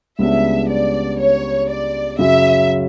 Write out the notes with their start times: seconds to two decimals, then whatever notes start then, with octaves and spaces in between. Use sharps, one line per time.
0.19 C#2 C#3 G3 B3 D4 E5
0.68 D5
1.19 C#5
1.69 D5
2.19 F#2 C#3 F#3 E5